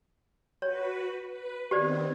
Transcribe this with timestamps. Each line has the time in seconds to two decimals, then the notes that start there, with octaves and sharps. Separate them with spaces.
0.62 F#4 B4 C#5
1.30 B4
1.71 D#3 B3 C4 G4 C5 D5